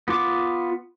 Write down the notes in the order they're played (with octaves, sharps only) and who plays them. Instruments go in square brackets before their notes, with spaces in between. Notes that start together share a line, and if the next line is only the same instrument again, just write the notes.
[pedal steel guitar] B3 F4 D6